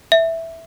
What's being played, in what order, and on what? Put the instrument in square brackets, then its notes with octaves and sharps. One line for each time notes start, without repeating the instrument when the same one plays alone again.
[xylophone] E5